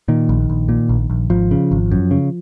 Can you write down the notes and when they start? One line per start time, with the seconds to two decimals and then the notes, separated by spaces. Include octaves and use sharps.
0.08 A#2 D#3
0.29 A#1
0.50 A#1
0.69 A#2
0.89 A#1
1.10 A#1
1.30 G#1 F3
1.51 C#3
1.72 G#1
1.92 F#2
2.11 C#3